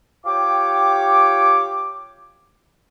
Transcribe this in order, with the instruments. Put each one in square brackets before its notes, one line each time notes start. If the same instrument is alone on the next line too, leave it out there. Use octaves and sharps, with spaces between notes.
[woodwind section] F4 G4 C#5 G5 D6